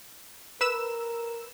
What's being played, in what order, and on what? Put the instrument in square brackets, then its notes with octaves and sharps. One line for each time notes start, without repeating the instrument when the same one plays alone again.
[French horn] A#4 [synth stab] B4 E6 E7